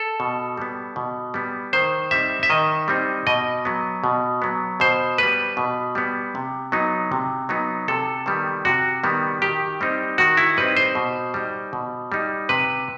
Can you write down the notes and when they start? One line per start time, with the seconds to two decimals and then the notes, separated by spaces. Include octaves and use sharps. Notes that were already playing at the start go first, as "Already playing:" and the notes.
Already playing: A4
0.20 B2
0.57 G3 B3
0.96 B2
1.34 G3 B3
1.73 D#3 C5
2.11 G3 C4 D#4 E5
2.43 E5
2.50 D#3 D#5
2.88 G3 C4 D#4
3.27 B2 D#5
3.65 F#3 B3
4.04 B2
4.42 F#3 B3
4.80 B2 C5
5.18 G3 B3 B4
5.57 B2
5.95 G3 B3
6.35 C3
6.72 F#3 B3 D#4
7.12 C3
7.49 F#3 B3 D#4
7.88 C3 A4
8.26 D#3 G3 B3
8.65 C3 F#4
9.03 D#3 G3 B3
9.42 D#3 G4
9.81 G3 C4 D#4
10.18 D#3 F#4
10.37 E4
10.57 G3 C4 D#4 B4
10.77 C5
10.95 B2
11.34 G3 D#4
11.73 B2
12.12 G3 D#4
12.49 C3 B4